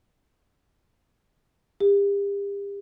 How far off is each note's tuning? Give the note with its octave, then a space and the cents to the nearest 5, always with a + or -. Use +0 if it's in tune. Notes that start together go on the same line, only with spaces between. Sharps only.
G4 +40